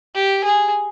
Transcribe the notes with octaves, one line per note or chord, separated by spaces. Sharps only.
G4
G#4